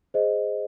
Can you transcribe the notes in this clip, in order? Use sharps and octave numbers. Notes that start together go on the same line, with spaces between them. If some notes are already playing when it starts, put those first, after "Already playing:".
G#4 C5 D#5